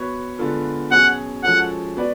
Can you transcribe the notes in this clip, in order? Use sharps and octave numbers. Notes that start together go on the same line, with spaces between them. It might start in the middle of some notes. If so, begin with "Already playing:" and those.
Already playing: B3 F#4 C#5
D3 G#3 B3 F4 A4
B2 F#3 C#4 G#4 F#5
F3 G#3 C#4 F#4 A4 F#5
B3 F#4 B4 D5